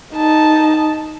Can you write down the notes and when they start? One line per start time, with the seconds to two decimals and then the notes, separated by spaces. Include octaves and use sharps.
0.14 D#4 A5